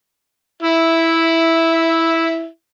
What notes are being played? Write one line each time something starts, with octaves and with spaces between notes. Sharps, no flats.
E4 E5